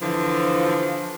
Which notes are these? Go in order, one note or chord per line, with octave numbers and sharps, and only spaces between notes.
D3 E3 F3